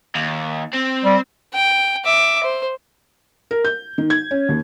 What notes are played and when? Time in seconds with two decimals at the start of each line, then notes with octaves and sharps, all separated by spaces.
0.15 D#2
0.73 C4
1.04 G3
1.54 G5
2.06 E5 D6
2.43 C5
3.51 A#4
3.65 G6
3.98 D#3
4.10 G#6
4.31 C#4
4.49 D#2